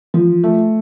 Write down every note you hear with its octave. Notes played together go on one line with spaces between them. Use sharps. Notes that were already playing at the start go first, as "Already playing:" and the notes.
F3
A3